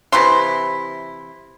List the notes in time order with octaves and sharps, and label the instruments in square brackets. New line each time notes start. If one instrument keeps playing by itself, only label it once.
[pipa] C3 E3 E4 C6